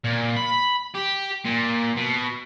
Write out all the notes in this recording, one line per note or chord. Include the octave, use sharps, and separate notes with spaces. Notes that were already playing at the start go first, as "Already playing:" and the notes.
A#2
B5
G4
A#2
B2